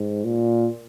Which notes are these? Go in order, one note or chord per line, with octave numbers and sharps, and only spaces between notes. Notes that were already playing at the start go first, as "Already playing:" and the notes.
Already playing: G#2
A#2